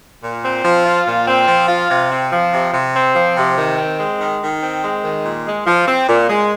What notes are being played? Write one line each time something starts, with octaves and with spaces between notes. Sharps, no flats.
A#2
C4
F3
F4
A#2
C4
F3
F4
C3
C4
F3
C3
C3
C4
F3
C3
D#3
C4
G#3
D#3
D#3
C4
G#3
D#3
A#2
G#3
F3
C4
A#2
G#3